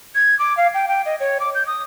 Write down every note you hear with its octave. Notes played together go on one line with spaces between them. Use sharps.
G#6
D6
F5
G5
G5
D#5
C#5
D6
G6
D#6